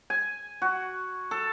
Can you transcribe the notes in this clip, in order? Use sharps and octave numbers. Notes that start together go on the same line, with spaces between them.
G#5
F#4
A4